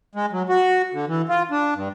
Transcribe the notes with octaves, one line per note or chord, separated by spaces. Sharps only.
G#3
F#3
F#4
D3
E3
F4
D4
G2